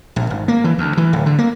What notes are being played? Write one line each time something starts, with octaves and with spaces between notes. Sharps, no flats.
A#1
G#1
A#3
E3
D2
E3
D1
D3
A#3